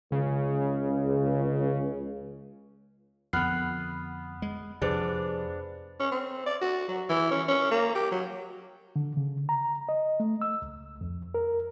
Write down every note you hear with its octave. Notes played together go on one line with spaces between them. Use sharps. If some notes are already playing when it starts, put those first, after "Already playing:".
C#2 C#3
F2 D3 B3 F6 F#6 C7
G#3
F2 C3 D4 G#4 B4 C5
C#4
C4
D5
F#4
F#3
E3
C#4
C#4
A#3
G4
F#3
D3
C#3
A#5
D#5
A3
E6
C#2
F2
A#4